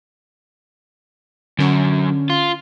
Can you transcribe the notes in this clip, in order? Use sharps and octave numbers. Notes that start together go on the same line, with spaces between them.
F#2 D3 C#4
F4